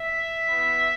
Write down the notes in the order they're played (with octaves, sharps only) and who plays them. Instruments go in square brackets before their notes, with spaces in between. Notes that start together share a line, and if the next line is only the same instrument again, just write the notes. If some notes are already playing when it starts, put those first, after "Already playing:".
Already playing: [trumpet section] E5
B3 E4